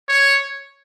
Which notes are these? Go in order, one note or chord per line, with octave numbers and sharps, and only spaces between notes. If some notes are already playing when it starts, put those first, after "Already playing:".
C#5